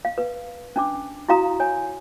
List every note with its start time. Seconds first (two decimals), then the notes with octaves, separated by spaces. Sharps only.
0.05 F5
0.18 B4
0.76 C#4 D4 D6
1.29 E4 F#4 F5 A#5 D#6
1.60 C#5 G#5